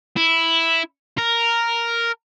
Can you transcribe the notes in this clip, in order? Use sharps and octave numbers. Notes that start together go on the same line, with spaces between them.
E4
A#4